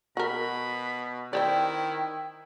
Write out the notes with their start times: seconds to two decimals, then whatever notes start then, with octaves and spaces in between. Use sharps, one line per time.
0.17 B2 F#4 A#4 B5
1.33 D#3 C4 E4 C5 D5 G5